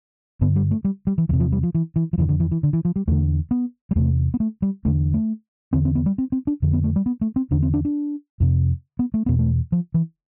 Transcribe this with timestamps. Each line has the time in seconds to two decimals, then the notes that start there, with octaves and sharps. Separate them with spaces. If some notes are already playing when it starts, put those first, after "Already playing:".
0.41 G2 D3 B3
0.56 G3
0.71 A3
0.85 G3
1.07 G3
1.18 E3
1.29 E2 C3 E3
1.40 F3
1.52 G3
1.63 F3
1.75 E3
1.96 E3
2.13 F3
2.18 F2 D3 E3
2.29 D3
2.40 E3
2.52 E3
2.63 D3
2.73 E3
2.85 F3
2.96 G3
3.08 E2 D3 A3
3.51 B3
3.91 G3
3.96 E2 C3 A3
4.34 B3
4.40 A3
4.62 G3
4.85 E2 D3 A3
5.14 A3
5.73 E2 D3 C4
5.85 C4
5.95 B3
6.06 G3
6.18 C4
6.32 C4
6.47 D4
6.62 F2 D3
6.73 B3
6.84 A3
6.96 G3
7.06 B3
7.21 A3
7.36 C4
7.51 E2 D3 D4
7.63 C4
7.74 D4
7.85 D4
8.40 F2 C3
8.99 B3
9.14 A3
9.26 E2 B2 B3
9.39 A3
9.72 F3
9.94 E3